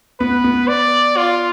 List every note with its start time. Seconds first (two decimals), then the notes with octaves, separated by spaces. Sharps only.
0.20 B3 B4
0.44 B3
0.68 D5
1.17 F4